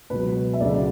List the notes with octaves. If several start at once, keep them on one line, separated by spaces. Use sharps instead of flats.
C#2 B2 F#3 B4
E5
D2 C#3 F#3 D5